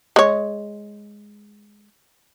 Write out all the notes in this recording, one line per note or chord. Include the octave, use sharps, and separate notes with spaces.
G#3 C#5